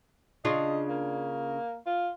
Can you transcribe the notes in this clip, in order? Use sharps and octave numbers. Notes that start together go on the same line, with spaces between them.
C#3 D4 F4 D#5
A#3
F4